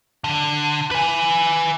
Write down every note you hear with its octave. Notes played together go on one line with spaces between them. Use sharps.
D3
B4 G#5